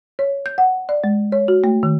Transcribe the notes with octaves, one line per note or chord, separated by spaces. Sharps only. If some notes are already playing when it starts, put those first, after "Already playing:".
C#5
G6
F#5
D5
G#3
C#5
F#4
A3
D#3